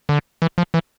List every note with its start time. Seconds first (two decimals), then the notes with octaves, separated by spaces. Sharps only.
0.09 D3
0.42 E3
0.58 F3
0.74 E3